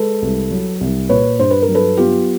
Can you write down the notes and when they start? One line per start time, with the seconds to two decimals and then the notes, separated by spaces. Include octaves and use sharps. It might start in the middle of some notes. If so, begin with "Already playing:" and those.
Already playing: G#3 A4 B4
0.22 C2
0.51 F#3
0.81 C2
1.09 A#2 B4 C#5
1.39 G2 C5
1.51 B4
1.62 A#4
1.69 F#3
1.75 A4 B4
1.97 B3 F4 G4